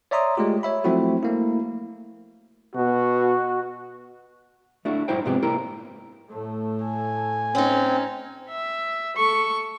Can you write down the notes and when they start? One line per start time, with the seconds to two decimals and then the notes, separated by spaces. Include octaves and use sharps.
0.11 C#5 D5 E5 A#5 C6 D#6
0.37 G#3 A3 F4 G4
0.63 C#5 E5 B5
0.84 F3 F#3 A3 C4 E4 F#4
1.23 A3 A#3 E4
2.75 B2 F#4
4.85 A3 D4 E4 F#4
5.08 G2 D#4 E4 C5 G5
5.25 G#2 C3 F3 B3 G4
5.42 A#3 E4 G4 A#4
6.29 A2 A3
6.85 G#5
7.55 C4 C#4 D#4
8.49 E5
9.17 A4 C#6